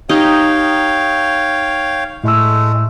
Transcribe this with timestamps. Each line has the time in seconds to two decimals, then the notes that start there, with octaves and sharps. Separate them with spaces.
0.09 D#4 G4 C#5 F5 G5
2.24 A2 G#3 A3 E6